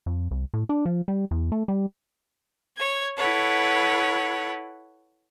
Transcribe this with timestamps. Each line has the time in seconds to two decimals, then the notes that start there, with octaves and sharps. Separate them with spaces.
0.06 F2
0.31 C2
0.54 A2
0.69 D4
0.86 F3
1.08 G3
1.31 E2
1.52 A3
1.68 G3
2.77 C#5 G#6
3.17 E4 A4 B4 C#5 F#5